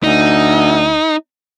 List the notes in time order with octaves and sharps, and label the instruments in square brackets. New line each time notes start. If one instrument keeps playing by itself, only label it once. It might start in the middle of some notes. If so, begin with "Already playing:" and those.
[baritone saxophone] D2 [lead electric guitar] D#4